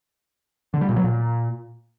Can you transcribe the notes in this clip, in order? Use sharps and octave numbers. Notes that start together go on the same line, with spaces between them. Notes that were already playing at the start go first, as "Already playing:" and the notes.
D3
G3
A#2
F#3
A#2